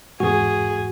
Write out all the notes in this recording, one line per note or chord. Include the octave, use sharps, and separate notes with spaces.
E2 G#2 F#4 G#4